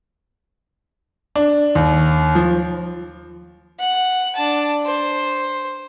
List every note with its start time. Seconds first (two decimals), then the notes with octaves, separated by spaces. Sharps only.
1.36 D4
1.75 D#2
2.35 F3
3.79 F#5
4.35 D4 A5
4.86 C5